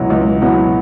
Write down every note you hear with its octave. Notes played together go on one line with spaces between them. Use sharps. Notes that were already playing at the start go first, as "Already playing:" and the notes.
Already playing: C#2 B2 F#3 B3 E4
C#2
B2 F#3 B3 E4